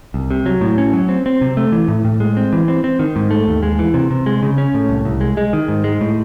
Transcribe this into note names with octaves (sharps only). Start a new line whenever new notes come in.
C2
C3
F#3
A2
C#4
F#3
C4
C4
C3
A3
E3
A2
A2
G#3
C4
E3
C4
C4
D#3
G#2
A3
D#2
G#3
E3
C3
C3
G#3
C#3
C#4
A2
C2
C2
G#3
G#3
D#3
G#2
G#3
A2